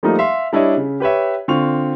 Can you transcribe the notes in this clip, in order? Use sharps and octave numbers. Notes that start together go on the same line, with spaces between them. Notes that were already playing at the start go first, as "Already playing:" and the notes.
F3 G3 A3 A#3 D#4 F4
E5 F5 C6
G3 D4 E4 C#5 D#5
C#3
G4 B4 C#5 E5
D3 C4 F4 C#6 F7